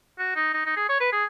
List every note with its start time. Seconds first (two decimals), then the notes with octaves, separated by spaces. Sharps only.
0.19 F#4
0.35 D#4
0.53 D#4
0.66 D#4
0.77 G#4
0.89 C#5
1.00 B4
1.12 G#4